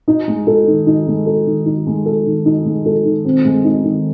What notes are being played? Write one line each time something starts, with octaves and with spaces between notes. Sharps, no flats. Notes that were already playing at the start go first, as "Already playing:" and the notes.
D#4
G#3
A4
D#3
D#4
G#3
A4
D#3
D#4
G#3
A4
D#3
D#4
G#3
A4
D#3
C4
G#3
D#4
D#3